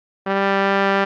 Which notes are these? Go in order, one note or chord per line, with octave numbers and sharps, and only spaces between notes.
G3